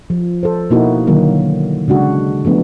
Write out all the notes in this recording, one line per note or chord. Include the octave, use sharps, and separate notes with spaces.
F3
A4 C5
B2 A#3 D#4 E4 F#4
D3 D#3 F#3 A#3
C#3 G#3 D4 F#4
F3 A3 B3 D4